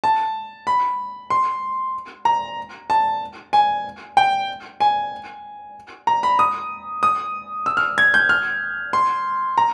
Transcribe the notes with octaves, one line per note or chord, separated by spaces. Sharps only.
A5
B5
C6
A#5
A5
G#5
G5
G#5
A#5
B5
D#6
D#6
E6
F6
G#6
G6
F6
C6
A#5